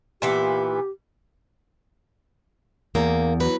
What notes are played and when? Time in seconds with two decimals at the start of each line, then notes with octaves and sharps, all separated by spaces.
0.22 A#2 E3 B3 G4
2.95 E2 A#3
3.40 D2 F#3 B4